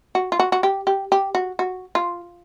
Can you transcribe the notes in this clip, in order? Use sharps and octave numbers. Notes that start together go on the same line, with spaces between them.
F#4
F4
F#4
F#4
G4
G4
G4
F#4
F#4
F4